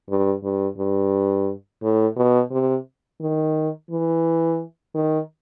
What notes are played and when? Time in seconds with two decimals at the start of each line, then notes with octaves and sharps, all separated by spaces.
0.09 G2
0.43 G2
0.78 G2
1.83 A2
2.16 B2
2.51 C3
3.21 D#3
3.90 E3
4.95 D#3